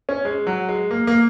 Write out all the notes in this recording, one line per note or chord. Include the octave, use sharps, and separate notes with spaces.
C#4
G#3
F#3
G#3
A#3
A#3